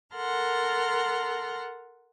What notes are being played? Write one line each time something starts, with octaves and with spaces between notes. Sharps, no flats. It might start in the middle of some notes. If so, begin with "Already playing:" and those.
A4 A#4 F#5 C6 F6